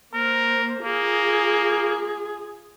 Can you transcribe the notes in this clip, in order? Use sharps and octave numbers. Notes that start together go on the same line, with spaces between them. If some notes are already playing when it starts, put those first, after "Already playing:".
A#3 A#4 C5
A#3 F4 G#4